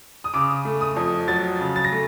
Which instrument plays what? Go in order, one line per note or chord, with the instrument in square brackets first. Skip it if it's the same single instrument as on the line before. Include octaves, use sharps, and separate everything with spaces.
[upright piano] D#6
C#3 D6
A3
D#6
F2
F#3 A6
C#3
A6
A#6
A3